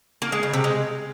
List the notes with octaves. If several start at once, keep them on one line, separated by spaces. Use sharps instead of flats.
A#3
G#3
C#3
C3
G#3